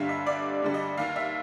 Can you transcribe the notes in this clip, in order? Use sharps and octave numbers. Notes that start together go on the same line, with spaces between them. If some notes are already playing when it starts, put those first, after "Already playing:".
Already playing: G1 G2 D3 G3 E5 F5
D#5
G1 D5
G2 D3 G3
D#5
D#2 F5
E5